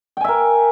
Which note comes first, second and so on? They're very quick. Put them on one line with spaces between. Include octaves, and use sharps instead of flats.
G5 G#5 E5 A#4